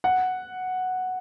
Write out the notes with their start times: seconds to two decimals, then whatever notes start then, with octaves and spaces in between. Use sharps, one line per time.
0.04 F#5